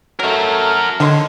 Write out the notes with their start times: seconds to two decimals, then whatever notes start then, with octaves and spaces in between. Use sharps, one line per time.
0.19 F#3 A3 F#4 A#4
1.00 D3 D#3 C#5 C6